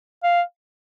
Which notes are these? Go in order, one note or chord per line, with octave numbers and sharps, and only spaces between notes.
F5